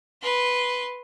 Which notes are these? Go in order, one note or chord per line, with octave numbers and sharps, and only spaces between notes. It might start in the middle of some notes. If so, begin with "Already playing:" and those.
B4 C6